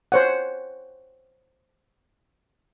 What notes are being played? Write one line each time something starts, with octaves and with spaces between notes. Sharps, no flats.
C5 C#5 F#5